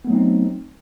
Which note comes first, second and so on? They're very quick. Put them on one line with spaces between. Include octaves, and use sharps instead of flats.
B3 A3 F#3 D#4 C4